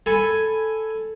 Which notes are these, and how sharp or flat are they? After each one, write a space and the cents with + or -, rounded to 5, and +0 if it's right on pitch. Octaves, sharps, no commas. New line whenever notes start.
A4 +0 G#5 +0 B5 +0